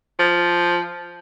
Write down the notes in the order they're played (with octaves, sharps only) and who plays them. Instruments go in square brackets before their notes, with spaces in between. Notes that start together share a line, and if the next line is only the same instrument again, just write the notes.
[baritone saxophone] F3